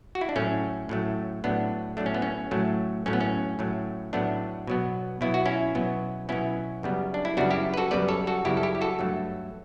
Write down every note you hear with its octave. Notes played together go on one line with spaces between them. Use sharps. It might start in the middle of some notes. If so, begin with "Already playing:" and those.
F#4
E4
D4
A2 F#3 A3 C#4
A2 F#3 A3
A2 F#3 A3 B3 D4
A2 F#3 A3 D4
C#4
B3
C#4
A2 F#3 A3
A2 F#3 A3 C#4
B3
C#4
A2 F#3 A3
A2 F#3 A3 B3 D4
B2 F#3 B3
B2 F#3 B3 E4
F#4
C#4 E4
B2 F#3 B3
B2 F#3 B3 C#4 E4
F#2 C#3 G3 B3
D4
E4
F#2 C#3 G3 B3 D4 F#4
E4 G4
B4
F#4 A4
F#2 C#3 G3 B3 B4 D5
A4 C#5
F#4 A4
F#2 C#3 G3 B3 E4 G4
A4
E4 G4
G4
F#4 A4
G2 F#3 A3